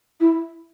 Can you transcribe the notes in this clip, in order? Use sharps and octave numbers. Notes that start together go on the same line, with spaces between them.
E4